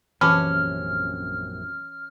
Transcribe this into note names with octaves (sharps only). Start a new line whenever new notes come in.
A#1 F#2 C3 E3 C#4 A5 D6 F6